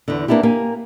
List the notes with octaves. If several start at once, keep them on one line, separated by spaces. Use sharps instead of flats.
E2 D3
A#3 B3 D4 E4 G4
A#3 G4 G#5